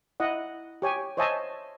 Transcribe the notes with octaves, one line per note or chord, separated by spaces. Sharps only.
E4 D#5 F#5
G4 C#5 G#5
C5 C#5 D#5 E5 G#5 A5